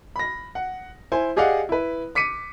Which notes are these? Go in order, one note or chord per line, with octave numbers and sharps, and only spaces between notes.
B5 A#6
F#5
E4 C5 G#5
G4 G#4 D5 D#5 F5 F#5
E4 B4
D6 B6 C#7 D#7